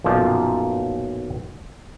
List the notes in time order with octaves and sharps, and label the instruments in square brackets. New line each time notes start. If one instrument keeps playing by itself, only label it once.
[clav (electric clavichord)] B1 F#2 A#2 F3